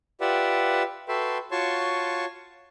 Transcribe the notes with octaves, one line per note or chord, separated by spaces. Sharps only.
F4 G4 B4 D5 E5 F#5
F#4 A4 B4 E5 G5 C6
F4 F#4 C#5 A5 C6 C#6